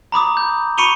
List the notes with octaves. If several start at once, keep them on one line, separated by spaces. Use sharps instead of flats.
A#5 B5 D6 D#6
G6
B5 C#6 C#7 D#7 F7 G7